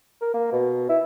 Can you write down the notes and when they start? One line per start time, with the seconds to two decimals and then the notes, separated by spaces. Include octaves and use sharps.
0.21 A#4
0.34 A#3
0.52 B2
0.89 E4